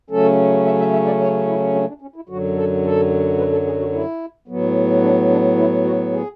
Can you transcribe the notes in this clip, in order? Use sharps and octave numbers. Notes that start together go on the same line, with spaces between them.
C#3 F#3 A3 C#4 A4
E5
E5
E5
D5
C#5
E4
D4
D4
C#4
E4
F#2 D3 F#3 F#4
A4
A4
B4
A4
G#4
F#4
E4
A2 F#3 B3
D4
D4
E4
F#4
G#4